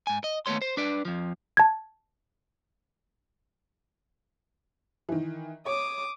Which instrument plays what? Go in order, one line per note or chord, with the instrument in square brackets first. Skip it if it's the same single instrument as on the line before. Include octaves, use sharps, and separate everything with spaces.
[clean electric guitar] G#2 G#5
D#5
D#2 A3 B3 C#5 C6
C5
D4 B4 D5
F2 F3
[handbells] A5 G#6
[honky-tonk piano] D#3 E3
[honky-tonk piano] C#5 [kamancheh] D6 D#6